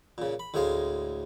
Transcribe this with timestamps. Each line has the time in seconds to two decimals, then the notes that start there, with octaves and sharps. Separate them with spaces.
0.18 A#2 C#3
0.40 B5
0.54 D2 A2 G#3 G#4 F5